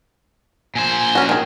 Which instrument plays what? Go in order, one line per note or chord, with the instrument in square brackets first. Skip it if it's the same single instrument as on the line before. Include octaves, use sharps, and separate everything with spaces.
[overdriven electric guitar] A#2 C5 [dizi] G#5
[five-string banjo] C#4 F#4
D#3 G#4